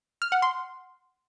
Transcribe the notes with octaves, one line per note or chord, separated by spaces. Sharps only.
F6
F#5
C6